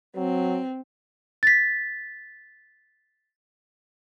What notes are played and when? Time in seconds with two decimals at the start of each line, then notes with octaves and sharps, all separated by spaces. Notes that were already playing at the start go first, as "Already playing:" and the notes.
0.16 F#3 C4
1.43 A6 B6